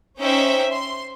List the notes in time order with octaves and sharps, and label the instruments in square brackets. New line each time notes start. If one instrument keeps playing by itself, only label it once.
[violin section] C#4 D#4 C5 E5 G5
C6